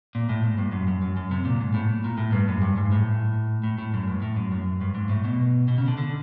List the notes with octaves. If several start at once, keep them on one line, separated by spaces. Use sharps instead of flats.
A#2
A2
G#2
G2
F#2
F#2
F#2
F#2
C3
A#2
G#2
A2
A#2
A2
G2
F#2
G2
G#2
A2
A2
A2
F#2
G2
A2
F#2
F#2
G2
G#2
A2
B2
B2
C#3
D3
D3